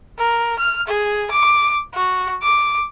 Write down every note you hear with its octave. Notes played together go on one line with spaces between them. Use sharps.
A#4
F6
G#4
D6
F#4
D6